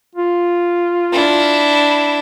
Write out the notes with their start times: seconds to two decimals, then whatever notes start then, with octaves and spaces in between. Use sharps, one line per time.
0.15 F4
1.13 D4 E4